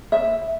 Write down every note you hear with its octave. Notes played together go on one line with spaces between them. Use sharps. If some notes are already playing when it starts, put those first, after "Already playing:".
E5